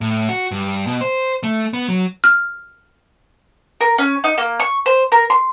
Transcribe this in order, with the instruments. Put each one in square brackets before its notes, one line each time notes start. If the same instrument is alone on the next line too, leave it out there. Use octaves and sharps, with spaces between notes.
[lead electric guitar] A2
F#4
G2
B2
C5
A3
B3
F#3
[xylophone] F6
[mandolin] A#4
C#4
D#4
A#3
C#6
C5
A#4
C6